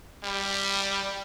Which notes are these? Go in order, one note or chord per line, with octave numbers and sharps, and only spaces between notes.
G3